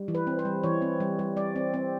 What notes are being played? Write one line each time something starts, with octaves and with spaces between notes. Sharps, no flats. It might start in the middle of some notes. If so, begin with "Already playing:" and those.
Already playing: G3
E3
B4
C4
C5
G3
E3 C#5
C4
G3
G3
G3 D5
C4
C4